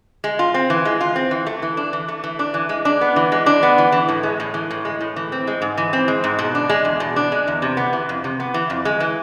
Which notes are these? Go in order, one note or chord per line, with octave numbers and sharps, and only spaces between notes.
G#3
F4
C4
E3
G#3
F4
C4
E3
A3
E3
D4
E3
A3
E3
D4
E3
G#3
D4
B3
E3
G#3
D4
B3
E3
E3
A2
G#3
A2
E3
A2
G#3
A2
E3
C4
G#3
G#2
E3
C4
G#3
G#2
B2
D4
G#3
E2
B2
D4
G#3
E2
C3
B3
E3
F2
C3
B3
E3
F2
G#3
E3